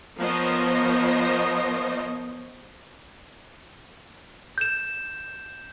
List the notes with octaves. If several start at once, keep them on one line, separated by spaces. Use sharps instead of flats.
F3 B3 A#4 C5 C#5 D#5
G6 E7